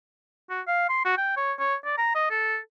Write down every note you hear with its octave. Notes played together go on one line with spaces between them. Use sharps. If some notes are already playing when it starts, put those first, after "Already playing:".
F#4
F5
C6
F#4
G5
C#5
C#5
D5
A#5
D#5
A4